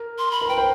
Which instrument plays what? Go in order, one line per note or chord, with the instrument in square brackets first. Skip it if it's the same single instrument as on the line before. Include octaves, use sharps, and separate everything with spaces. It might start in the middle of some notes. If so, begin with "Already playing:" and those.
Already playing: [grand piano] A#4
[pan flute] C6
B5
[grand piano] A#4
[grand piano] B4 [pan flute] G5
[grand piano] C5